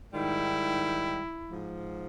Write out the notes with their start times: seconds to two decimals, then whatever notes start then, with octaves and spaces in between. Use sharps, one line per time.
0.12 G#2 D#3 G3 E4
1.50 G#2 F3